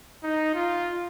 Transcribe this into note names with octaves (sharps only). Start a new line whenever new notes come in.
D#4
F4